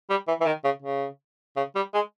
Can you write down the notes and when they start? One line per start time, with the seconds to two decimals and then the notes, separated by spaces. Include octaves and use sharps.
0.10 G3
0.28 E3
0.41 E3
0.46 D#3
0.64 C#3
0.83 C#3
1.57 C#3
1.76 G3
1.94 G#3